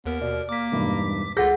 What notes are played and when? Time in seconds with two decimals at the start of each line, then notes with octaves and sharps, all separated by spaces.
0.06 D#2 B3 A#4 F6
0.22 B2 D5
0.49 A#3 D6 B6
0.72 E1 G2 D#4
1.37 C#2 F4 G#4 A4 F#5 G6 A#6 B6